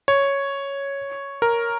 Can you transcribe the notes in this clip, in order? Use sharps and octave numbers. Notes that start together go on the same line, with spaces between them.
C#5
A#4